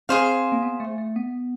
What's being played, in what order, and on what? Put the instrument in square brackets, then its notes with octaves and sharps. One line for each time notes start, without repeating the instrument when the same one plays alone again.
[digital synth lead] C4 [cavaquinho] G#4 C5 F5
[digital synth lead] A#3
B3
A3
A3
B3